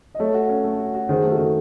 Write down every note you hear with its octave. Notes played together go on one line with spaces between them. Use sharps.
D#5
A3 A4 C#5
F#4
C#4
A3
F#4
F#4
D#3 G#4 C5
A3
F#4 A4
D#3